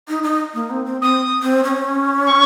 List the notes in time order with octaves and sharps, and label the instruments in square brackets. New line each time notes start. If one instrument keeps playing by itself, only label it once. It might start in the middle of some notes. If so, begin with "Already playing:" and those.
[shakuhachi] D#4
D#4
A#3
C4
C4
[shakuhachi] C4 [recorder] D#6
[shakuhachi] C4
C#4
[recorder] C#6